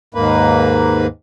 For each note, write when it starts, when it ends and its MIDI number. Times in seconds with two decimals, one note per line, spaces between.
0.14 1.06 39
0.14 1.06 44
0.14 1.06 58
0.14 1.06 71